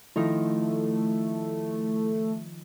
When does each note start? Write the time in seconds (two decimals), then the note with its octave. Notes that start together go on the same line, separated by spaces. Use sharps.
0.16 D#3 F3 A3 D#4 E4